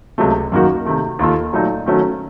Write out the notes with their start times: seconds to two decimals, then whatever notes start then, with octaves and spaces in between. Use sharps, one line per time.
0.18 C#2 C3 F#3 A3
0.52 F#2 D#3 A#3 D#4 F#4
0.85 C3 D#3 A3
1.19 D#2 D#3 A#3 F4 A4
1.53 A#2 F#3 A3 D#4
1.86 D#3 F#3 A3 C#4 F#4